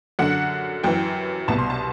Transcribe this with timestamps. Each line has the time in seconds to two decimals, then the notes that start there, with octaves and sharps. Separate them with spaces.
0.19 F#2 D3 F#5
0.83 F#2 E3 G5
1.48 C2 B2 A5
1.58 C6
1.70 A5